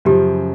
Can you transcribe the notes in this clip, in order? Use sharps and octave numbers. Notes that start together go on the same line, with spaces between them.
F#2 C#3 F3 G4